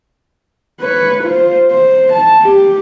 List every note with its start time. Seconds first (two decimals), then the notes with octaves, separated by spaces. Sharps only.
0.81 B4 C#5
1.24 F4 C5
1.70 C5
2.12 A5
2.41 G4